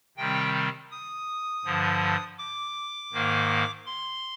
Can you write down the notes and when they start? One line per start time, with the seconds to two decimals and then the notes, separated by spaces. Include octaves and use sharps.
0.17 C3 D#3 G3 C4 G5
0.91 D#6
1.65 G2 D3 F3
2.39 D6
3.13 G#2 D#3 A#3
3.86 C6